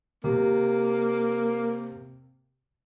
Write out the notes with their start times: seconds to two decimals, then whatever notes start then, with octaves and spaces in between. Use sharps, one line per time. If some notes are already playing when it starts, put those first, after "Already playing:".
0.24 C3 A#3